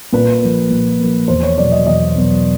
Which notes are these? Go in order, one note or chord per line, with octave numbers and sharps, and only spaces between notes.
A#2 B4
F3 A#3
A#2
F3 A#3
E2 C5
C#5
B2 F#3 B3 D5
D#5
E2 D#5
B2 F#3 B3